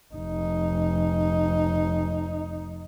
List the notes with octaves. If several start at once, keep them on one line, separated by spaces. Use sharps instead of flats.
F1 D#4